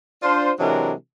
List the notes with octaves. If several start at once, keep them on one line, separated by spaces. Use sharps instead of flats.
D4 F4 C5
C3 E3 F#3 G#3 D4 A#4